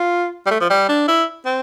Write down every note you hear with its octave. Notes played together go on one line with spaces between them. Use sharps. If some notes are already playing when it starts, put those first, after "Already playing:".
Already playing: F4
G3
A3
F3
G3
D4
E4
C4